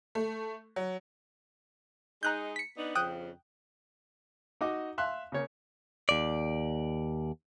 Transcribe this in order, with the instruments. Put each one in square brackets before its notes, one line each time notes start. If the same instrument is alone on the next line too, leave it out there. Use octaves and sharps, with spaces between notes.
[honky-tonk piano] A3
F#3
[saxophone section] G#3 D#4 [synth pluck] A#5 F#6 G6
[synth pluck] B6 C#7
[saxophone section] B3 D4 D#4
[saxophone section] F2 C#3 F3 [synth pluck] G5 D#6 F#6
[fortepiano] D#4 F#4 D#5 D6
E5 F5 C6 F#6
C#3 A#3 C#5
[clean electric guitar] D#2 D5